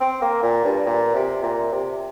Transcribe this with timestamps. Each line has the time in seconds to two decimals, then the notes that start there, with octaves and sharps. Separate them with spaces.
0.01 C4
0.22 A#3
0.43 A#2
0.65 G2
0.86 A#2
1.15 C3
1.43 A#2
1.72 C3